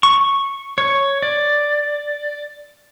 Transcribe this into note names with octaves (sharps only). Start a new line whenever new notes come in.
C#6
C#5
D5